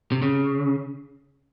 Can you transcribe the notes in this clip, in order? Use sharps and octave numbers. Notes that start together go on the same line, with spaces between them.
C3
C#3